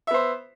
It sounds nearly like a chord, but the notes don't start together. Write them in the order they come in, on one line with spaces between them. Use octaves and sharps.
E5 B3 C5